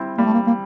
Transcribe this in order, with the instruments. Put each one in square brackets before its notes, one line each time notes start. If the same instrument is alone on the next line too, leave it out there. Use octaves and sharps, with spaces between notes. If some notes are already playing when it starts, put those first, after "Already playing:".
Already playing: [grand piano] G3 C4 E4
[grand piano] G3 [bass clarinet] A#3
[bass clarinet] A3
A#3
A#3